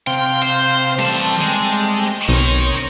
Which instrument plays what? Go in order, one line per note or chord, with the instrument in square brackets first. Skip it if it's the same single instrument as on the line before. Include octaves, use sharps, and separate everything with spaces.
[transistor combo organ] C3 C4 F5 [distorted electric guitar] G5
[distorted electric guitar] C5
[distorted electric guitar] E3 A5 [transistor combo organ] G3 A3 C4
[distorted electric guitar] G#3
[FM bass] B1 [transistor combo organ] C4 C#5 [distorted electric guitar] D#4 A#4